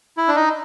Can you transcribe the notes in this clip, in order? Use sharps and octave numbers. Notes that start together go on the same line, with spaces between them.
E4
D4
D#4